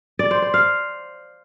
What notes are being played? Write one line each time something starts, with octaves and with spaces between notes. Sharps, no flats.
D5
C5
C5
F5